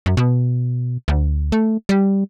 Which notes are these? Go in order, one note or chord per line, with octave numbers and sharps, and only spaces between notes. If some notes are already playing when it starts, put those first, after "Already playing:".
F#2
B2
D2
A3
G3